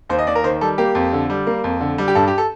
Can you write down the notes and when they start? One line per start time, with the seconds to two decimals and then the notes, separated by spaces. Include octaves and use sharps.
0.10 D#2 C5
0.18 D#5
0.27 D#2 D5
0.35 A#4
0.44 D#3 C5
0.61 G3 A4
0.78 A#3 G4
0.95 F2
1.13 D3
1.30 G3
1.47 A#3
1.64 F2
1.81 D3
1.98 G3
2.08 G4
2.15 G2 A4
2.28 G4
2.38 A4